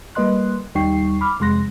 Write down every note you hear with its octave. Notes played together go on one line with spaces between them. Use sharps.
G3 A#3 B4 D#5 C6 F#6
D#2 G3 D#4 G5 C#6 C7
B5 D6 F6
F2 C3 G#3 C6 F#6 A#6